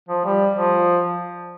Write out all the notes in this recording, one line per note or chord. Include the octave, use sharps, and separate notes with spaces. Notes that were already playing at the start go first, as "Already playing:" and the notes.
F3
G3
F3